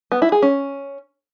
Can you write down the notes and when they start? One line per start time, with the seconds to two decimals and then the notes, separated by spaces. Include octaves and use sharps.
0.12 B3
0.22 E4
0.32 G#4
0.42 C#4